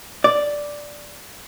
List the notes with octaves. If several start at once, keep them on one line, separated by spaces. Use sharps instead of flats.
D5